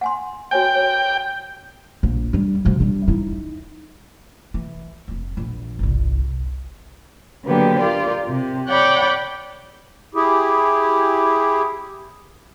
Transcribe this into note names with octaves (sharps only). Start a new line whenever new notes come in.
F#5 G#5 C6
F#4 C#5 G5 G#5
C#5
A#1
G3 D4
B2 F3
G3 D4
D#4 E4
E3
F1 F2
A#1 E2
G1 C2
D3 F#3 A#3 B3 G4
F4 G4 A#4 D5
C3
C#5 D5 F#5 G5 B5 D6
E4 G4 G#4